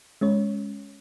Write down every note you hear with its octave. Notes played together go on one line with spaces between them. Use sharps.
G#3 C#4 C#5